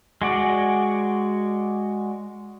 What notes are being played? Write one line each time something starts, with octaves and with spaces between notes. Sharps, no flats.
G#3 F#4 D5